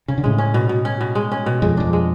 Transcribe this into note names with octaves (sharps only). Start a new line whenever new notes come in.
C#3 C#4
D3
A2 C#3 G#3
C#4
B2
B2
C#4
B2
G#3
C#4
B2
F2 G#3
F2 D4
G#3